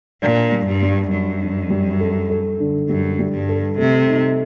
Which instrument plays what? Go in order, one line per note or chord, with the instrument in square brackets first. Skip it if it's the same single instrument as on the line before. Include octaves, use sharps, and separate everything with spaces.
[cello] A#2 [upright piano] D4
[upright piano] G3
[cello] G2
[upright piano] G3
[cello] F#2 [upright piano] D4
[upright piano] D4
G3
A4
A4
D3
[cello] F#2 [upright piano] G3
[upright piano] G3
[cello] G2
[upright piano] A4
[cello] C3 [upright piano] A3
[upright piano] D#4